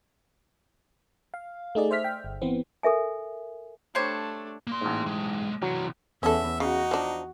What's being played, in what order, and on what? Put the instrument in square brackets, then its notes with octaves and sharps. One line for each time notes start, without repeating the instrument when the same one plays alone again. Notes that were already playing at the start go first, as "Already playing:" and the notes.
[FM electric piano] F5
A3 D#4 G#4 D5
C5 E5 F6 B6
G5
G1
E3 B3 C4
[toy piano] A4 A#4 E5 G#5
[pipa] G3 C5 C#5 [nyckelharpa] A3 D4
[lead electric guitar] A#3 C6
[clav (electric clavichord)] A1 G#2
[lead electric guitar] B1 G#3
[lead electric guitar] C3 E3 [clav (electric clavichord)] F#3
[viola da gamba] E2 [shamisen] C#4 A4 [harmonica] E5
[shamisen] C#3 [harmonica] D#4 [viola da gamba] F#4
[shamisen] F3 D4